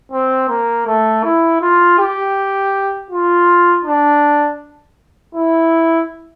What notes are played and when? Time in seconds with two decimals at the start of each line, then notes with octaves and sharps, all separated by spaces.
0.12 C4
0.49 A#3
0.87 A3
1.24 E4
1.61 F4
1.99 G4
3.11 F4
3.85 D4
5.35 E4